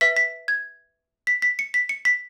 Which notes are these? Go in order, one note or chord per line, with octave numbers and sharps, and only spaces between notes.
B4 E5 B6
B6
G#6
B6
B6
C#7
B6
C#7
B6